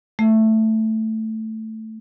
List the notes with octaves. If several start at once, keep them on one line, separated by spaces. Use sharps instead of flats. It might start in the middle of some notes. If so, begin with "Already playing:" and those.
A3